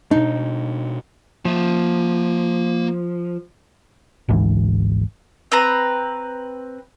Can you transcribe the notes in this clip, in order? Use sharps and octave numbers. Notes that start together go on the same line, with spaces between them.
B2 D4 D#4
F3 A#3 E5
G#1 D2 G#2 E3
C4 B4 A#5